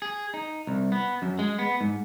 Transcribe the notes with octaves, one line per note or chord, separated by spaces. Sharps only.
G#4
D#4
C2
B3
F#2
G#3
B3
G#2